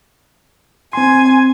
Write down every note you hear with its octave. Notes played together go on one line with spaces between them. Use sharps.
C4 G#5 C6